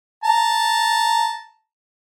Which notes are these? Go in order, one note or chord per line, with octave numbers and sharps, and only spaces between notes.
A5 A#5